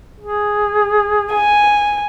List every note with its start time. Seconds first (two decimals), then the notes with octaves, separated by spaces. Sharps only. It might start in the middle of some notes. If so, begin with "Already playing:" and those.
0.20 G#4
1.34 G#5